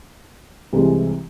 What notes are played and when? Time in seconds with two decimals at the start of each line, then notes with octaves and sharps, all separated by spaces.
0.73 C2 C3 E3 G#3